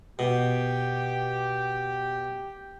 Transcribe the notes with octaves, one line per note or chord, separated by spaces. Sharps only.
B2 G4